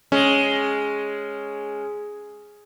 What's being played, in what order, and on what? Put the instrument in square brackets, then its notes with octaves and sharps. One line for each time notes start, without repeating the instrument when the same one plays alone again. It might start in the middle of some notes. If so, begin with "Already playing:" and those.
[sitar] G#3 [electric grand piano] C#4